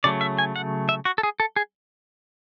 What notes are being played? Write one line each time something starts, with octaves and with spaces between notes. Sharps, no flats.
C#3 F#3 A3 D5
E5
G#5
F#5
E5
F#4
A4
G#4
A4
G#4